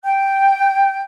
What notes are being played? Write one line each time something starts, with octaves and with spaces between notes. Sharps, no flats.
G5 G6